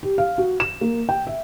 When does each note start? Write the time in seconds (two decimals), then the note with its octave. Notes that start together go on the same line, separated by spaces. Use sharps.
0.03 G4
0.18 F5
0.38 F#4
0.60 E7
0.81 A#3
1.09 G5
1.27 E5